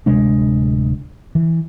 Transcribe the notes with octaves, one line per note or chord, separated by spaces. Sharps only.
D1 C3 G#3 D4
E3